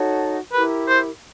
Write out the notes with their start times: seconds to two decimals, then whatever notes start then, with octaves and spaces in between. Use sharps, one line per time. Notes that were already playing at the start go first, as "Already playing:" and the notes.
Already playing: D#4 F#4 A4 C#5
0.52 E4 G4 A#4 B4
0.88 C5